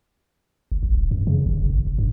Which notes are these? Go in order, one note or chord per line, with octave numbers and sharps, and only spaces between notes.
F#1
A#1
D#1
F#2
C#3
G1
E1
G#1
F1
G2